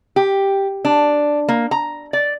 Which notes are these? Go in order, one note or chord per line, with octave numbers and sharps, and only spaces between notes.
G4
D4
A#3
A#5
D5